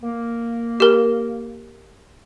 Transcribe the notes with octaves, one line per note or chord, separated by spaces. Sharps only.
A#3
G4 A#4